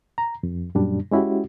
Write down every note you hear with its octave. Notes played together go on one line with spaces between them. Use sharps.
A#5
F2
F#2 A#2 G3 D4
G#3 C#4 E4 F#4 G4